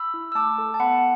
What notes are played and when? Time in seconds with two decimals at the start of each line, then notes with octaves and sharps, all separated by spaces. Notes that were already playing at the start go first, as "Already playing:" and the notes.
Already playing: B5 E6
0.14 E4
0.32 E6
0.35 A3 A5 D6
0.58 A4
0.74 A5
0.80 B3 F#5 B5